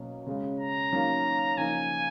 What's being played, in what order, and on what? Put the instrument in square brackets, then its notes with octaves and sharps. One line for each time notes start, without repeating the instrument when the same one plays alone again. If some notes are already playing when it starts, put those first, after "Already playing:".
Already playing: [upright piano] B2 F#3 A#3 C#4
C#3 G#3 C#4
[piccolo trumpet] A#5
[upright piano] D#3 F#3 A#3 C#4
[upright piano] C#3 F3 A#3 D#4 [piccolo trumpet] G#5